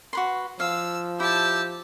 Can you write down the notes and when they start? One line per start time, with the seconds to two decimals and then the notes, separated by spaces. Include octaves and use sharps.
0.13 F#4 B4 C6
0.60 F3 F5 E6
1.20 E4 G4 A5 E6